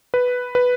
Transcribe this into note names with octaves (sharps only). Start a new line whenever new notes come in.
B4
B4